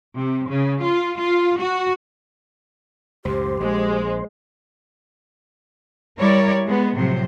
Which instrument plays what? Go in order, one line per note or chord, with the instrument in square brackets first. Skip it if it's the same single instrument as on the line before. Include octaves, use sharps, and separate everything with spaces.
[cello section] C3
C#3
F4
F4
F#4
[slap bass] C#2 F#2 A2 [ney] G4 [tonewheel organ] C5
[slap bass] A#1 [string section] G#3
[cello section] G3 E4 A#4 C#5 D5
G#3 B3
A2 C3 F3 F#3 C5